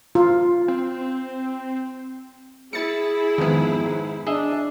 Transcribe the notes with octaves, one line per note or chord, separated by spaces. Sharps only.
F4
C4
E4 G#4 A6 C#7
F2 G#2 D#3 B3
G#2
D4 G#4 D#5 E5